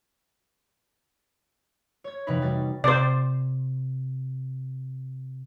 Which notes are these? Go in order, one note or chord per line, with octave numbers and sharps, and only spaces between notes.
C#5 G#6
F1 C3 E3 D#4 B4 B5
G3 F#4 A6
C3 C5 D5